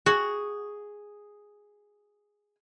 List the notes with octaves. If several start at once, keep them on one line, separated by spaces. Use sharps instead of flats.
F#4 G#4